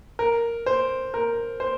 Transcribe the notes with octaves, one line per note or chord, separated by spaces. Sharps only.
A#4
C5
A#4
C5